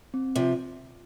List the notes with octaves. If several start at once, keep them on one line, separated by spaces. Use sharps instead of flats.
C4
C3 F3